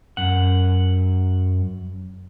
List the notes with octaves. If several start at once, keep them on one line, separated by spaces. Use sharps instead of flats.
F#2 F#5